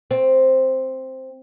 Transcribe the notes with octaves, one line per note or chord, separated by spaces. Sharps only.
C4